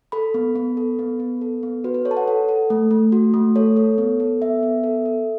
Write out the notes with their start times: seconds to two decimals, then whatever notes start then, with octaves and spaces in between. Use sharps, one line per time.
0.12 A4 B5
0.34 B3
0.56 B3
0.77 A4
0.99 B3
1.20 B3
1.41 A4
1.63 B3
1.84 F#4 B4
1.94 B4
2.05 A4 C#5
2.11 A5
2.17 F#5
2.28 A4
2.49 A4
2.70 A3
2.91 A3
3.12 F#4
3.34 A3
3.56 A4 C#5
3.77 A4
3.98 B3
4.20 A4
4.42 B3 E5
4.63 B3
4.84 A4
5.06 A4